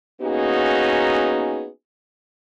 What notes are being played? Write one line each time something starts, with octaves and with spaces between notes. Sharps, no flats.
A#3 B3 C#4 D#4 F#4 G#4